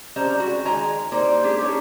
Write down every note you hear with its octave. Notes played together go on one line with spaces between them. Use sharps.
G3 C#4 C5 D#5 A#5
G3 G#3 F#4
D#3 G#3 C#5 D#5 G#5 A#5
G3 A#3 D#4 C5 D5
G#3 D4 G4 G#4
G3 C#4 D#4 A4 C#5